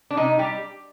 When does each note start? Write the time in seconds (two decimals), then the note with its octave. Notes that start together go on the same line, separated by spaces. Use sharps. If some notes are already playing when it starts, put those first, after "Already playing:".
0.11 D4
0.17 C3 D#4
0.39 G3 G4